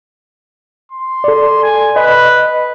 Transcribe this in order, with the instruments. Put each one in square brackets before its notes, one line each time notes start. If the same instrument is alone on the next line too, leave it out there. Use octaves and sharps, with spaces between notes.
[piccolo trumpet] C6
[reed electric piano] A4 D5
[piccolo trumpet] G#5
[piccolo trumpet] B4 [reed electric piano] D#5